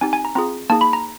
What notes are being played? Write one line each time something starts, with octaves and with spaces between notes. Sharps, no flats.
C4 D#4 G4 G#5
G#5
A#5
C4 F4 G#4 A#5
A#3 D#4 G#4 A5
B5
A#5